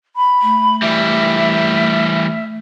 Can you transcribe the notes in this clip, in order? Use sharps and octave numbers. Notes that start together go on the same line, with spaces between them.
B5
A3
E3 G3 E5